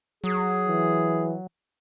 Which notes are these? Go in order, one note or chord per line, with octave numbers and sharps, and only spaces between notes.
F#3 G#4
E3